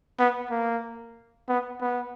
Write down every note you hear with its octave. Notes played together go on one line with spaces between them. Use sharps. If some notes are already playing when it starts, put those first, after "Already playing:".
B3
A#3
B3
B3